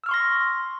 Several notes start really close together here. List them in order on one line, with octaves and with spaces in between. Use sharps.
E6 F6 C#6 C6 A#6